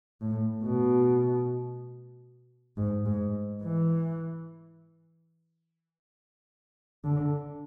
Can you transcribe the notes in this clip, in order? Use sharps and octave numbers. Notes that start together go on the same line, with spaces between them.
A2
B2
G#2
G#2
E3
D3